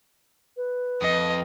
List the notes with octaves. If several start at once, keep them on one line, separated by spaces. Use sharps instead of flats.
B4
F2 D#5